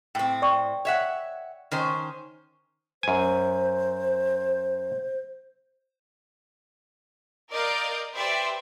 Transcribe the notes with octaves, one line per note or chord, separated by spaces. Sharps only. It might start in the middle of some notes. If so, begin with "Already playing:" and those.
A2 C4 G5
D5 G5 C#6
C#5 E5 F#5
D#3 C#4 C5
F#2 C5 G#5
A#4 D5 D#5 F5 G6
G4 B4 C5 D5 E5